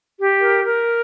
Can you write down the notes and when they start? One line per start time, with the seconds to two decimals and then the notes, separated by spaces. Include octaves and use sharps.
0.18 G4
0.41 A#4
0.65 A#4